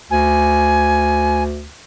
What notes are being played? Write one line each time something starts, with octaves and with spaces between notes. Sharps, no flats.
D2 G#5